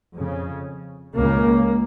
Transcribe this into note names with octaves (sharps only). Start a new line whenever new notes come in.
F2 C#3
C#2 C#3 A#3